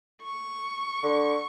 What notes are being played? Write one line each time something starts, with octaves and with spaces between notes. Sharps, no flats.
C#6
D3